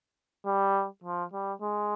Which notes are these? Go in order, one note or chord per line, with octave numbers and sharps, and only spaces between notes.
G3
F3
G3
G#3